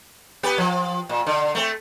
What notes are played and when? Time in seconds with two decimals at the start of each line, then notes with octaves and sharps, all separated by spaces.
0.43 B3 G4 B4
0.58 F3
1.09 A#2
1.27 D3
1.55 A3 C4